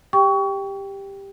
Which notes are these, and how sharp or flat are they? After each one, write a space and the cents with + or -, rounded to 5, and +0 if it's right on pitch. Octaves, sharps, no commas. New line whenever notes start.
G4 +10 G5 +0 C#6 +25